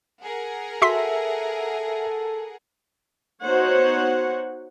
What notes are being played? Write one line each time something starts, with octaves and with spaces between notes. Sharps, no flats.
G#4 A#4 F#5
F#4 A4 E5 C6 B6
B3 D#4 F#4 C5 C#5 F#5